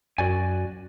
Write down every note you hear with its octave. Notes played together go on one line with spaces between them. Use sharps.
F#2 F#4 D5 G#5